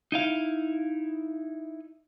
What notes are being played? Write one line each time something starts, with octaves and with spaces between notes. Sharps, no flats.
D#4 E4 F5